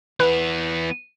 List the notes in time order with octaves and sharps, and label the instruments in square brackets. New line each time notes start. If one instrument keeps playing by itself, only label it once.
[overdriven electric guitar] E3 B3 [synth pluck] B4